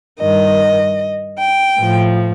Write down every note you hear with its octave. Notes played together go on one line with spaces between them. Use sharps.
G2 D#3 D#5
G5
A2 F3